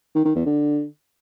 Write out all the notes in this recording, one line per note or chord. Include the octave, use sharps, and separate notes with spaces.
D#3
D#3
E2
D3